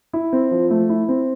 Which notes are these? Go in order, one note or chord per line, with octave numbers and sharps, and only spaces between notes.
E4
C4
F3
A3
E4
C4